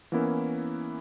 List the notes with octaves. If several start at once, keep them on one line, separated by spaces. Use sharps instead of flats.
E3 A#3 B3 C#4 E4 A#4